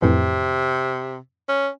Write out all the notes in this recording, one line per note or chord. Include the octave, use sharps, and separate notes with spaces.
F2 A2 C3 E3
C#4